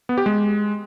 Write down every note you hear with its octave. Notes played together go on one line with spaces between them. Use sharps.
B3
G4
G#3